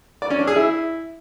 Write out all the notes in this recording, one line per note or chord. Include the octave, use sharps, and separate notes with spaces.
D5
C#4
D4
G#4
E4